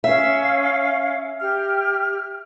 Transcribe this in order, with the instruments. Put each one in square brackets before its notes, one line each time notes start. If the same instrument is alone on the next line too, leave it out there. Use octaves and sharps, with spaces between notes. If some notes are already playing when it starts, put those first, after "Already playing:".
[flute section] C#4 F5 [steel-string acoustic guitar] E5
[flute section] G4 F6